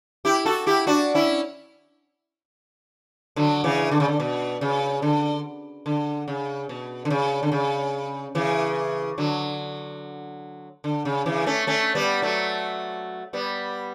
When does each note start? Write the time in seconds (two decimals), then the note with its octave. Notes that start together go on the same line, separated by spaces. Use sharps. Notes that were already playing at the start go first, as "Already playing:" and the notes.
0.25 E4 G4
0.46 F#4 A4
0.66 E4 G4
0.87 D4 F#4
1.15 C#4 E4
3.36 D3 F#3
3.64 C#3 E3
3.91 D3
4.00 C#3
4.08 D3
4.20 B2
4.61 C#3
5.02 D3
5.86 D3
6.28 C#3
6.69 B2
7.05 D3
7.10 C#3
7.43 D3
7.52 C#3
8.35 C#3 E3
9.18 D3 F#3
10.84 D3
11.05 C#3
11.26 C#3 E3
11.46 A3 C#4
11.67 A3 C#4
11.95 G3 B3
12.22 F#3 A3
13.33 G3 B3